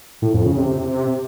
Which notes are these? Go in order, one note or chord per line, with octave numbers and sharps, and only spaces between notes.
A2
F2
C#3
C3